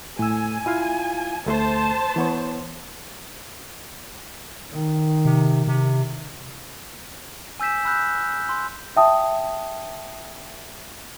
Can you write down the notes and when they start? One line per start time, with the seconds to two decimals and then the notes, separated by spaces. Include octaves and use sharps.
0.19 A2 G#5 E6
0.66 E4 F4 F5
1.46 D2 A3 C5 A5 C6
2.16 E3 B3 C#5
4.72 D#3
5.25 C3
5.67 C3
7.60 G#5 E6 G6 B6 E7
7.85 B5 E6 F#6 G6
8.49 C6
8.96 E5 G5 A5 D#6